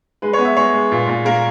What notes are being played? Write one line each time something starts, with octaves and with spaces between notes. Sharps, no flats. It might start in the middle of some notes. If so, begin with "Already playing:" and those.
G#3 B4
C#5
B3
E5
G#3 C#5
G#3
A#2
A#2
A#3 A#4